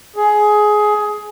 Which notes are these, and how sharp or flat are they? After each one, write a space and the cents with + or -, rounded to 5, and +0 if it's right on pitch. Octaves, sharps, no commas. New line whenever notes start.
G#4 +15